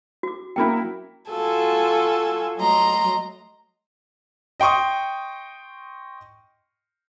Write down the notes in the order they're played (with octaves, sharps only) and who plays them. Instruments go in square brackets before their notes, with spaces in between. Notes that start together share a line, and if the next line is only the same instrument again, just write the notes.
[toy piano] F#4 D6
[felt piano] F#3 A#3 E4 [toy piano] C#4 G5
[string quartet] F4 F#4 A4 G#5 A5
F#3 A3 D#5 A#5 C6
[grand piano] D#5 G5 C6 C#6 D#6